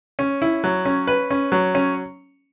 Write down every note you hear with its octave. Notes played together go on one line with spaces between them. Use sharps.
C#4
E4
F#3
C#4
B4
C#4
F#3
C#4